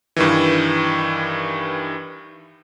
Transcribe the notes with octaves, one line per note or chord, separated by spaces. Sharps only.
G2 D#3 E3